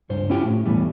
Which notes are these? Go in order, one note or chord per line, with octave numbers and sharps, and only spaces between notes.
C#2 G2 C5
C#4 E4 F4 G4 G5
A2
B1 E2 A2 E3 G3